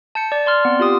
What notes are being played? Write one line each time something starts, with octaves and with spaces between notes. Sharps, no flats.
A5 G6 C#7
D5
D5 C6 F6
B3 C4
F4 G4 D#6